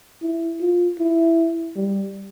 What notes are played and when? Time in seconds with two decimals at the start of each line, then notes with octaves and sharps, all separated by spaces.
0.22 E4
0.61 F4
0.99 E4
1.76 G3